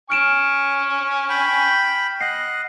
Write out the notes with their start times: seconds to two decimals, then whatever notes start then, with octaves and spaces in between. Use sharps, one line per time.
0.10 G#5 C#6 F6 D7 E7
1.29 G5 B5
2.21 D#5 F#5 C7